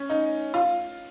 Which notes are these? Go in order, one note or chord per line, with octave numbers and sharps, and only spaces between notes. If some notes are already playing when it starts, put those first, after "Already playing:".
Already playing: C#4
D#4
F4